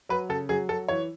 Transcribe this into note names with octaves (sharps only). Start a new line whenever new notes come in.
F#3 B4
C#3 A4
F#3 G#4
F#3 A4
E3 C#5